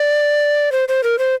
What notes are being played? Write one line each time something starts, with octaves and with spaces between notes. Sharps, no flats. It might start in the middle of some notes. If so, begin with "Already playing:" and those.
Already playing: D5
C5
C5
A#4
C5